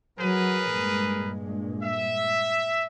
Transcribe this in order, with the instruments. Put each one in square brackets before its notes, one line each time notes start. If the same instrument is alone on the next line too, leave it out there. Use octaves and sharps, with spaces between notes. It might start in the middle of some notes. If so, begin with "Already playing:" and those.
[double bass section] F#3 [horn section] G#4 A#4 B4
[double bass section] G2 A#2 G#3
[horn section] E5